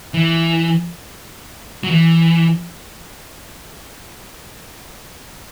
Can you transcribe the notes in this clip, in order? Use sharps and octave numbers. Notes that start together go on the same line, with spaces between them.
E3
F#3
E3